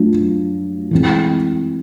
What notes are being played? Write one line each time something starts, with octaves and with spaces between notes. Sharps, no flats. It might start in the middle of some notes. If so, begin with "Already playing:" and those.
Already playing: F#3 A3 D4 F4
E3 G#3 C4